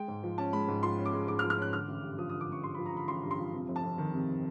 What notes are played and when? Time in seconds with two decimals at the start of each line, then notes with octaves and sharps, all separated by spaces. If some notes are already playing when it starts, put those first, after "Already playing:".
Already playing: G#3 G5
0.08 G#2
0.23 F3
0.38 C#4 A5
0.53 G#3 B5
0.68 G#2
0.83 F3 C6
0.98 C#4
1.05 D6
1.13 G#3
1.28 G#2 D6
1.39 F6
1.43 F3
1.50 F6
1.58 C#4 F#6
1.73 D3 F6
1.88 A1
2.03 G2
2.18 F3 D#6
2.29 D3 D#6
2.41 D6
2.49 A1 C#6
2.63 G2 C6
2.74 F3 B5
2.85 A#5
2.93 D3 B5
3.08 A1 C6
3.23 G2
3.31 C6
3.38 F3
3.54 C3
3.68 F1
3.76 A5
3.83 F2
3.98 D#3
4.14 C3